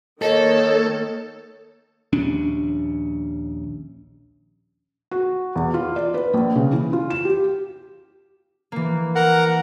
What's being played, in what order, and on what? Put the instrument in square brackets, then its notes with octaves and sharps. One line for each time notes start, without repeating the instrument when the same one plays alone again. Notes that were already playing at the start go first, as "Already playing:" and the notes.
[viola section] D#3 A#3 [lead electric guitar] A4 [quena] C#5 [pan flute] D#5
[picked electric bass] A#1 D#2 C#4 D4
[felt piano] F#4
E2
F4
D5
B4
A#1
C#3
E3
F4
E7
G4
[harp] E3 A#3
[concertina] A#4 F#5